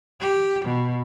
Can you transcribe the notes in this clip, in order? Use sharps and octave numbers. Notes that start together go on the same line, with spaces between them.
G4
B2